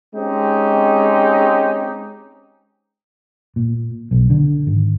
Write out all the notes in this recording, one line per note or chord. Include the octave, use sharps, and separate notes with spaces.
G#3 C4 C#4 D#4 G4
A#2
B1
D3
G#1